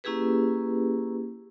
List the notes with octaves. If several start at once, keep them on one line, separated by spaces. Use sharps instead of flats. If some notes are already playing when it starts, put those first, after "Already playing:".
A#3 C#4 E4 G4 G#4 B4